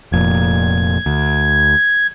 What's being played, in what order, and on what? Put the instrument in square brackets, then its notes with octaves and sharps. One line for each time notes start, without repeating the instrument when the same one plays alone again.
[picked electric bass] F1 F2 A#2 [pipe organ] G#6
[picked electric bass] D2